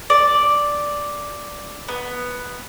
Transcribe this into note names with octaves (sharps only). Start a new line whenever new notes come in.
D5
B3